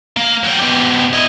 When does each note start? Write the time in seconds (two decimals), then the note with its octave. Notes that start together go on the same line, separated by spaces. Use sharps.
0.17 A#3
0.44 F#3 G5
0.59 B2 G4
1.13 E4 D#5